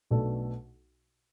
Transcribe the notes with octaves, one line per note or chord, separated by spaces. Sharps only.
B1 B2 A3 D4 A4